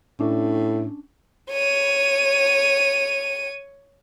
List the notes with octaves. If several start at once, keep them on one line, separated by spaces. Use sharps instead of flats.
A2 C#4 D4
C#5 D#7